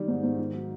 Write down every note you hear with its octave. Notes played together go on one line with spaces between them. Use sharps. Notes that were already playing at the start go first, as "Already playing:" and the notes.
Already playing: D#3 G3
G#2
G#2
D#3
F#3